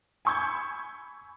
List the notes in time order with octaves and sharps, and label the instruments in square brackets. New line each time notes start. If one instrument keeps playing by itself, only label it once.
[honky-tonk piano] G#5 B5 C#6 E6 G6 G#6